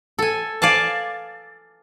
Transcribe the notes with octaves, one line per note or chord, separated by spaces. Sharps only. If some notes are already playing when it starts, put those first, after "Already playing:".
A4 G#5
D5 F5 G#5 A5